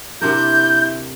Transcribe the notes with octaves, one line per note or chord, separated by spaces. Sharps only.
C3 D4 E4 A#4 G6